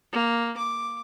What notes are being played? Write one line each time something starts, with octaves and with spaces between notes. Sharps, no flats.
A#3
D6